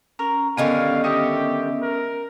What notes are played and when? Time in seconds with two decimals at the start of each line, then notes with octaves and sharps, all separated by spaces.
0.19 C#4 A#4
0.57 D3 D#3 G3 B3 C#4 F5 G#5
1.04 G4 D#5 E5 C#6
1.82 A#4